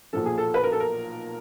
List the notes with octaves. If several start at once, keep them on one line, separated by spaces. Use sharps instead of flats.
B1 A#2 F3 A4
G#4
A4
B4
A#4
A4
A#4